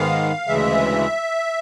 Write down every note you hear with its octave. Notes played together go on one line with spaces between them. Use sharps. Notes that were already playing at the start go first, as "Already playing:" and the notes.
Already playing: G#2 D#3 G#3 B3 F5
D2 C#3 E3 G#3 E5